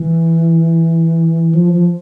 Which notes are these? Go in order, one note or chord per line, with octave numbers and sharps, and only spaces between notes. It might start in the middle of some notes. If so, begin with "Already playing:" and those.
Already playing: E3
F3
F3